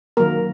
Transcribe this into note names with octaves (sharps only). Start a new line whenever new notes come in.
D#3 F#3 A#3 A#4